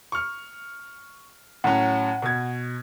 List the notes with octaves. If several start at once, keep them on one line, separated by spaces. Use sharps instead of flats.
C#6 F6
A2 F#3 C#4 F#5
B2 G#6